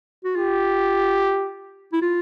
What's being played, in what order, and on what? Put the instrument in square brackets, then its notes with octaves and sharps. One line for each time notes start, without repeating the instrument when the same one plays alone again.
[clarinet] F#4
[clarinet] F4 [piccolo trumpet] G4
[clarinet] E4
F4